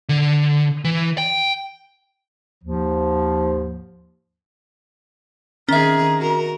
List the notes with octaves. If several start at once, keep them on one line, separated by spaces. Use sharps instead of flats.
D3
E3
G5
D#2 G#2 F3
D#3 C4 C#4 G#4 E5 A#5
F#4 A#4